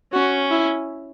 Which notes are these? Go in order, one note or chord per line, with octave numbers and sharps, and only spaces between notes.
C#4 F#4
E4